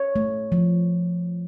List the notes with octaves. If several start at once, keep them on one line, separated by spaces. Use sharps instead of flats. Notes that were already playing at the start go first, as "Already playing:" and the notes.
Already playing: C#5
A3
F3